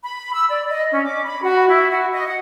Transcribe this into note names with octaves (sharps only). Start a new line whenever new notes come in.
B5
E6
D5
D#5
C#4
D6
B5
F#4
E4
F#4
D#5
F#5